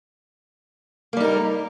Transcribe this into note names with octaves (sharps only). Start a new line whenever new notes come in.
G3 A#3 D#4 A#4